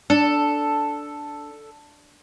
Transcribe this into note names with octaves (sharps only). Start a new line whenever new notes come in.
D4 A4